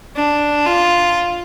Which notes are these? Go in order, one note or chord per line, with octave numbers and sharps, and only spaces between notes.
D4
F4